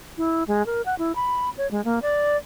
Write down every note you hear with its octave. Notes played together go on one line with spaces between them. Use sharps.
E4
G#3
A#4
F#5
E4
B5
C#5
G#3
A#3
D5